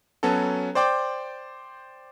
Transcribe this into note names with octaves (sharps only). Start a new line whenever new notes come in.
F#3 B3 C#4 F#4 A4
C5 D5 G5 D6